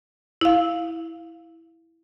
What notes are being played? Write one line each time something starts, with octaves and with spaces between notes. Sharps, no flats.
E4 F5